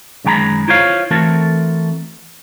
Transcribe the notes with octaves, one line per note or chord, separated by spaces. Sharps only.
F#2 D#3 G#3 G5 A#5 B5
E4 F4 C5 C#5 F5
E3 A3 C4 F#4 A4 A#4